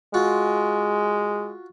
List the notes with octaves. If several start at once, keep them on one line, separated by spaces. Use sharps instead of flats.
G#3 F4 F#4